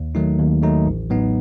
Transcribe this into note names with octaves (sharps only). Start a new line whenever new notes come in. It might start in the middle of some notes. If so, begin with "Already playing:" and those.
Already playing: D#2
D#3 F#3 A3 D#4
D#2
D#3 F#3 A3 D#4
A1
A2 F#3 B3 D#4